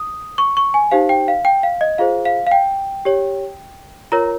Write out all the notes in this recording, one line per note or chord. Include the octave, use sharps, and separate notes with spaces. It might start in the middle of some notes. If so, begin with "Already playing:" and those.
Already playing: D#6
C#6
C#6
G#5
D#4 G4 C5 F5
G5
F5
G5
F5
D#5
F4 G#4 C5 F5
F5
F5
G5
G4 C#5
F4 A#4 C#5 A#5